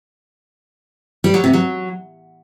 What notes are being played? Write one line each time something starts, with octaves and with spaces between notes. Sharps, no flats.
G3
F#3
C3
F#3